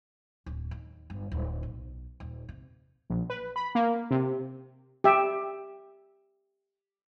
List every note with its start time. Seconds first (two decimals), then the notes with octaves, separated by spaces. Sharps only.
0.46 D1
0.71 D#2
1.10 G1
1.32 D1
1.63 B1
2.20 D#1
2.49 C3
3.10 A#1
3.30 B4
3.56 B5
3.75 A#3
4.11 C3
5.04 G4 E5